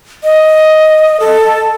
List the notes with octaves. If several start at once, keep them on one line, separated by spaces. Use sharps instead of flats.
D#5
A4